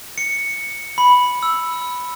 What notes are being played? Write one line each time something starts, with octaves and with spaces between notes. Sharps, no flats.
C#7
B5
E6